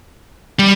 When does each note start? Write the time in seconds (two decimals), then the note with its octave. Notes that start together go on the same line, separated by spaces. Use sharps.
0.59 G3